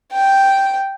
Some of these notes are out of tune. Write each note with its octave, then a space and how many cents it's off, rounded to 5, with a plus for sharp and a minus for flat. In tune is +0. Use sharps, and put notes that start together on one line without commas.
G5 -5